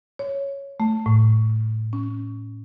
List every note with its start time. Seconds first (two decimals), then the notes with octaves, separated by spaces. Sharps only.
0.19 C#5
0.80 A3
1.06 A2
1.93 C#4